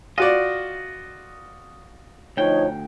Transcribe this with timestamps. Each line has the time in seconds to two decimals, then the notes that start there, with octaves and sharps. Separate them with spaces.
0.18 F4 F#4 D5 D#5
2.37 D2 F3 D#4 C#5 G5